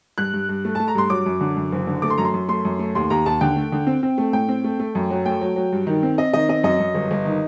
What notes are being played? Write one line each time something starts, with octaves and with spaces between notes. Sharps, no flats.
G2 F#6
G2
G2
A3
A3 A5
A#5
G2 C6
F#3 D6
F#2
D3
F#2
F#1
D3
A3 D6
C6
F#2 A#5
C6
F#2
A3 C6
F#2
A3
D#2 C6
D#2 A#5
D#2 A5
D3 G5
A3
D3
C4
C4
A3
A2 G5
C4
A3
A3
F#2
F#3
A3 G5
F#3
F#3
G2
D#3
C4
C4 D#5
D#3 D#5
C4 D#5
F#2 D#5
F#2
G1
G1
D#3